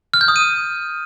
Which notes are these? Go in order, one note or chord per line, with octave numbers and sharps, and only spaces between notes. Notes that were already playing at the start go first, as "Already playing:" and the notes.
F6
G6
D#6
D#7